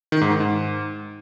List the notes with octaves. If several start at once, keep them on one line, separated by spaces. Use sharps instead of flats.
D#3
G#2
D#3
G#2